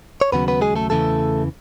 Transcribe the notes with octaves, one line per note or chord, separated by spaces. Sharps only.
C#5
D#2 C#3 F#3 B3 B4
B3 B4
G#3 G#4
A3 A4
E2 C#3 E3 A3 A4